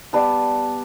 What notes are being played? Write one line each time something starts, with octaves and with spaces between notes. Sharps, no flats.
G3 B3 A5